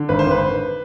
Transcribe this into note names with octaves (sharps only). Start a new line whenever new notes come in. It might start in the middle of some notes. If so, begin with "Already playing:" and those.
Already playing: D3
G#1 B4
C5
G#1 B4